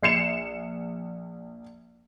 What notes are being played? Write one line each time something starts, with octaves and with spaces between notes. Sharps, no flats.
A#1 C7 C#7 E7